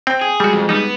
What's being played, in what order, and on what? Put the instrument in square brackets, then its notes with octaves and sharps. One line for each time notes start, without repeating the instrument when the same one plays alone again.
[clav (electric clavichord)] C4 [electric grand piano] G5
[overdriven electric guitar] G#4
[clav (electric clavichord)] G3 F#4 [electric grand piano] G#3
[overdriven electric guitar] F2
[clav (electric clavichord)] G3 D#4 [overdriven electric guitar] B3